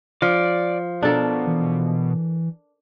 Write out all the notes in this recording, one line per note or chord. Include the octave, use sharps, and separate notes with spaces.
F3 D5
B2 D4 A4 A#4
E3